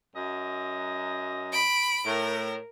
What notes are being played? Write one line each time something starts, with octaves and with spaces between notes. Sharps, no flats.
F#2 F#3 D#5
B5 D7
A2 A#4